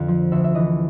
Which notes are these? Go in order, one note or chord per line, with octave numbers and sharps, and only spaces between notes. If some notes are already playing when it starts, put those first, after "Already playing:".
Already playing: F2 D3 F5
F3
D2 E5
E5
E3 D#5